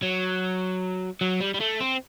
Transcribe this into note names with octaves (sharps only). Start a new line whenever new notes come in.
F#3
F#3
G3
G3
A3
C4